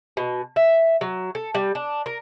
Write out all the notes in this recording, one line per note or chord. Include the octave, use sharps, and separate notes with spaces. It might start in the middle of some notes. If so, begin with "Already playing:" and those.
B2
E5
F#3
A4
G3
D4
A#4